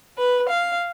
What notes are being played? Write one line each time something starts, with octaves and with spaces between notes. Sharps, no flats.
B4
F5